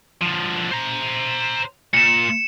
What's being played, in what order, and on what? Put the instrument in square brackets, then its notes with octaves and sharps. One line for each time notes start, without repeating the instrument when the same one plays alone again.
[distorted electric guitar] D3 F3
C5 A#5
[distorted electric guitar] A#2 [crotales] C#7 E7